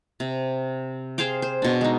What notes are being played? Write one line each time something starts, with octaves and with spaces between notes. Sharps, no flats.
C3
G#4 C5 F5 G5
C5
B2 D4
G#3 D#4